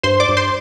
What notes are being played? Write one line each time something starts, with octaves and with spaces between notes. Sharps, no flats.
G2 C5 C6
D5 D6
G2
C5 C6